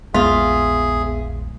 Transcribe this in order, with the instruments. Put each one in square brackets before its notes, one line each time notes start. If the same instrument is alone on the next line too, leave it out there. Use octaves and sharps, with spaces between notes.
[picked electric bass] A#1 E2 G#3 [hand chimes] B3 E5 B6 [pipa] F4 [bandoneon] G#4